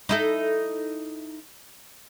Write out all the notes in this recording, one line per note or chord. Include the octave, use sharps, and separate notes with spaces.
D#4 E4 A4